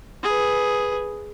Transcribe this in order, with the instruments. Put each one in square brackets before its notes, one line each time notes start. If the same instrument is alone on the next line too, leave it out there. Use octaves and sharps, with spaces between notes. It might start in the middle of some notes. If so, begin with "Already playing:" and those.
[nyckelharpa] G#4 B4